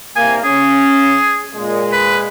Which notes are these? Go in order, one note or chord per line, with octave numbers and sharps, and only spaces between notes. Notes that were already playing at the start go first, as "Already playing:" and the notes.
C2 A#3 G#5
C#4 G#4
A#2 G#3
B4